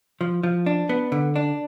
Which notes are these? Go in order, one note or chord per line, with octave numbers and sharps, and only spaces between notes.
F3
F3
D4
B3
D3
D4